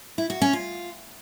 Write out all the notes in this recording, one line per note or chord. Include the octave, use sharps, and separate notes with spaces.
E4
F#4
C#4
F4